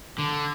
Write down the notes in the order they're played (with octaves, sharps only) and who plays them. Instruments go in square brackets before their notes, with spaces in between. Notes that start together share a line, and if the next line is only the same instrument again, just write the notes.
[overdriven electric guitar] D3